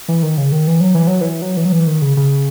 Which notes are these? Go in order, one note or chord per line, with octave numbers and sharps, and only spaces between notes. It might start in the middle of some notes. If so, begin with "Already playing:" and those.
E3
D#3
C#3
D#3
E3
F#3
E3
F#3
E3
F#3
E3
F#3
E3
D#3
C#3
C#3